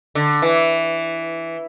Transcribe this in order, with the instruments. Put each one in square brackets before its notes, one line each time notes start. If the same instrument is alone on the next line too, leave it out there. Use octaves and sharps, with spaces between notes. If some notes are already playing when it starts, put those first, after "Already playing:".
[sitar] D3
E3